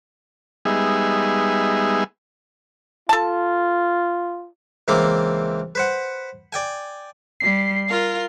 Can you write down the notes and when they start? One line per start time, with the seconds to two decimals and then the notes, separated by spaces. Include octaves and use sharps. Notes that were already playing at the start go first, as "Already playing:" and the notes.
0.65 G3 G#3 B3 D#4 G#4 E5
3.09 F4 A4 A5
4.88 C#2 E3 A#3 C4 C6 D6
5.75 B4 C5 F#5
6.53 D5 G5 G#5
7.40 G3 C7
7.89 F4 A#4 F5